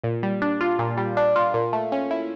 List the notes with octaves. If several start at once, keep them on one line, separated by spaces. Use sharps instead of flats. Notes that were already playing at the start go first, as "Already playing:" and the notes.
A#2
G3
D4
F4
A#2
G3
D4
F4
A#2
A3
C#4
E4